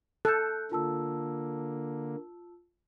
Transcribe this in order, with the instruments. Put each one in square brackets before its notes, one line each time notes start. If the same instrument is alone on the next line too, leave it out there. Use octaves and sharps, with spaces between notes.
[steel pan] A4 [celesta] F#6 G6
[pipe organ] D3 A#3 [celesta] F4 A5 E6